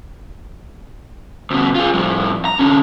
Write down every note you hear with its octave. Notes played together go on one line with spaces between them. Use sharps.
D2 B2
F4 G#4
F2 A2
A#5
D3 C#4